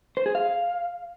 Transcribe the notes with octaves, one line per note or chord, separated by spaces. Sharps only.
C5
G#4
F5